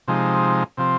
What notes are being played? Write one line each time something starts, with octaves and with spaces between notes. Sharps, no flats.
C3 F3 G#3 D#4
C3 F3 C4